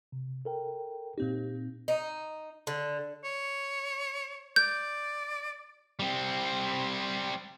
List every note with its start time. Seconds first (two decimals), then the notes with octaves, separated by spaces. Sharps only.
0.12 C3
0.45 A4 A#4 G5
1.18 A#2 C4 D#4 G4
1.88 D#4
2.67 D3
3.24 C#5
4.56 D5 G6
5.99 G3 C4